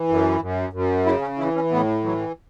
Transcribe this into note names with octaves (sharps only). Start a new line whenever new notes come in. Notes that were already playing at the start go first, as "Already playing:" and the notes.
Already playing: E3
F#2
F#2
F#2
C#3 E4
C#4
E3 E4
C#4
A2 B3
E3 F#3